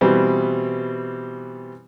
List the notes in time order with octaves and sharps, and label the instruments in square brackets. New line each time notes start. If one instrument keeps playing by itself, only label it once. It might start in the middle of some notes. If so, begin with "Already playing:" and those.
[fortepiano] B2 E3 G3 B3 C4